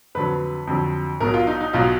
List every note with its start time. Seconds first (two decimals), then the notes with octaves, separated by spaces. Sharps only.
0.15 F2 D3 F#3 B4
0.67 F2 D3 F#3
1.20 B1 B2 F#3 A#4
1.34 F4
1.47 D#4
1.61 D#4
1.73 B1 B2 F#3 F4